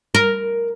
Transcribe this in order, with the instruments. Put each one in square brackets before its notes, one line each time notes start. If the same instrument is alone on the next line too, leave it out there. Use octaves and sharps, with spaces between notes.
[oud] A#4